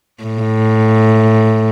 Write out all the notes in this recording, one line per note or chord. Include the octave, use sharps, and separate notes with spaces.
A2